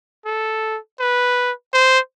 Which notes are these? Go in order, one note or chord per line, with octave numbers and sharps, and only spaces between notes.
A4
B4
C5